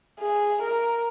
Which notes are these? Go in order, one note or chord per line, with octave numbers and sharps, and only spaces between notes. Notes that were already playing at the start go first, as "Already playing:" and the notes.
G#4
A#4